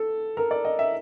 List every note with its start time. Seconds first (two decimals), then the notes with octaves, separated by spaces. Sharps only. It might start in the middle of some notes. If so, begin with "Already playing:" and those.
Already playing: A4
0.37 A#4
0.51 D5
0.65 D#5
0.79 E5